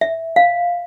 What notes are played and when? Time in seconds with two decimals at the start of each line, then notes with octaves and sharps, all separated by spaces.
0.01 E5
0.36 F5